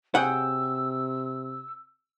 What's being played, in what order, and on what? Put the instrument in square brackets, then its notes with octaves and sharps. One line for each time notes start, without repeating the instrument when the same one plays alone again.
[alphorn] C3 [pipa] F#3 G#4 G5 [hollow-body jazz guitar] F#5 [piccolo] E6